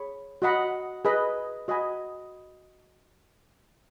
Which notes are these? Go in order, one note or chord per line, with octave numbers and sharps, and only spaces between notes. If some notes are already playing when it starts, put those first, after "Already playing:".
Already playing: G#4 C#5 B5
F#4 D#5 F#5 B5
G#4 B4 D#5 B5
F#4 D#5 G#5 B5